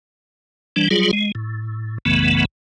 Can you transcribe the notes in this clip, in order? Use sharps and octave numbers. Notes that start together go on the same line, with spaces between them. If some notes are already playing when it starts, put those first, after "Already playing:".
E3 G3 D4
F#3 G3 F4 G#4
G#3
A2
B1 F#2 C#3 E3 A3 B3